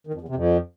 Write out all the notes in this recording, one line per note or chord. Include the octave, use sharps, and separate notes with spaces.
D#3
F2
E2
C3
F2